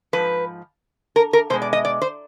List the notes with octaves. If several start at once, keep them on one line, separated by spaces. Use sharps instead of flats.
G#2 F3 B4
A#4
A#4
B2 G#3 C5
D5
D#5
D5
C5